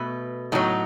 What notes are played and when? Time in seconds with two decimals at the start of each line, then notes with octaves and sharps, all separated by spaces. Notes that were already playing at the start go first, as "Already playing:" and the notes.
Already playing: B2 A3 B4
0.52 A2 F#3 B3 D#4